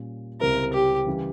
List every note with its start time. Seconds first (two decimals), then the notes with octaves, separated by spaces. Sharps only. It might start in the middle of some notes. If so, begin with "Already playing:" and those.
Already playing: A#2 G3 C#4
0.40 C#2 C3 G3 C4 E4 A#4
0.74 G4
1.07 C#3 E3 G3